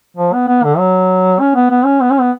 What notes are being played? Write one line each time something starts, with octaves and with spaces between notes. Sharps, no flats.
F3
B3
B3
D3
F#3
C#4
B3
B3
C#4
B3
C#4
B3